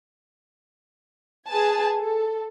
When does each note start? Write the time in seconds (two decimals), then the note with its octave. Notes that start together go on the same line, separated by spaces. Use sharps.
1.48 G#4 B4 G#5 A5
1.99 A4